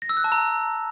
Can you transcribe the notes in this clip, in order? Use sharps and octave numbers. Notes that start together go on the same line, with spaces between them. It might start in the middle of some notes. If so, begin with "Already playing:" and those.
A#6
E6
F#6
A5
A#5